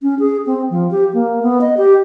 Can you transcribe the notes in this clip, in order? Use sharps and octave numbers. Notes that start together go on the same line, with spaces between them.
C#4
G#4
C4
F3
G4
A#3
B3
D#5
G4